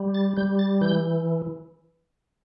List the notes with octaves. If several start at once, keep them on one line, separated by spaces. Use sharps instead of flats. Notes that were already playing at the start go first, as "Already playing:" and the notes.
Already playing: G3
A6
G3 G6
A6
E3 G6